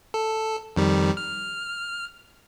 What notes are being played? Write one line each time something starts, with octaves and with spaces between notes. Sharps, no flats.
A4
F2 D#3 G3
F6